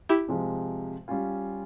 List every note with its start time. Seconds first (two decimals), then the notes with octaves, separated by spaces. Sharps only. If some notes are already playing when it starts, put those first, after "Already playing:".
0.09 E4 G4
0.28 C3 F3 G#3
1.08 G3 C#4 F4